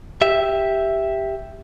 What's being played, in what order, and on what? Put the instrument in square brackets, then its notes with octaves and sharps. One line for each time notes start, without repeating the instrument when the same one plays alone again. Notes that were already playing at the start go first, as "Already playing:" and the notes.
[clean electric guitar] G4 E5